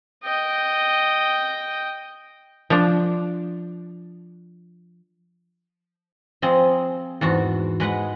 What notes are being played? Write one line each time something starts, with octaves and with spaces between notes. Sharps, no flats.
D#5 G5
F3 D4
F3 C4 G#4 D#5
E2 G#2 F#4
G#3 B4 D#5 F#5